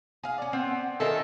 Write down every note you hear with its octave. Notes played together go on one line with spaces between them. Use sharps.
G#4 F5
C#4 D5
B3 C4
D#3 F4 A4 A#4 D#5 E5 G#5